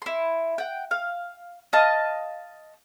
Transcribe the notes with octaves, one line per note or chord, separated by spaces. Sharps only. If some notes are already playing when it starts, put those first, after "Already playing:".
E4 C6
F#5 G5
F5
D#5 F5 A5 D#6